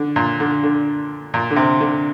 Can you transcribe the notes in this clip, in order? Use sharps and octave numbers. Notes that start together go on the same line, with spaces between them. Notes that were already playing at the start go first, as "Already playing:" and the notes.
Already playing: D3
A#2
D3
D3
A#2
D3
C3
D3